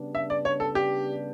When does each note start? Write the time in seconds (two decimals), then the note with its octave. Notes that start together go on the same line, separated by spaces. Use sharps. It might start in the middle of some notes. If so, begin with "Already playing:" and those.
Already playing: C#3 G3 B3 D4
0.15 E5
0.30 D5
0.45 C#5
0.60 A4
0.75 G4